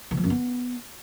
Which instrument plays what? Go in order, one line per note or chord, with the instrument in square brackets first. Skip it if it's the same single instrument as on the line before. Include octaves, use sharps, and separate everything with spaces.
[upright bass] D#3
F3
F#2
B3